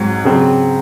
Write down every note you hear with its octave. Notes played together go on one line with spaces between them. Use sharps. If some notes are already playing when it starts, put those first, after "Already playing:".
Already playing: G#2 F#3 C4
C#3 F#3 C4